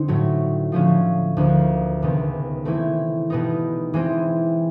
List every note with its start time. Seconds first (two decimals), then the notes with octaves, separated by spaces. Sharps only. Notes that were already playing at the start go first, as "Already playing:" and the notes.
Already playing: D3 C4 D#4
0.08 A2 F#3 A3
0.72 D3 F3 A3 C#4
1.37 D2 D3 F3 A#3
2.02 C#2 C3 D#3 G#3 B3
2.65 E3 A3 C4 E4
3.30 B2 G3 B3 D#4
3.94 E3 G#3 C4